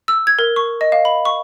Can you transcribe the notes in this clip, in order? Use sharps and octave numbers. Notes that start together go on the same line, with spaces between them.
E6
G#6
A#4
C#6
D#5
F5
B5
C#6